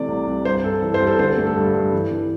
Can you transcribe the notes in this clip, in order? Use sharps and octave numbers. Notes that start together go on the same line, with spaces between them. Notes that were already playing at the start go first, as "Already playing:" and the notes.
Already playing: C3 E3 A3 D5
C2
C2
G2 C5
G3 A4
E3 A4
C5
G3
A4
D3 C5
A4
A3
A4
G2
G2
E3
E3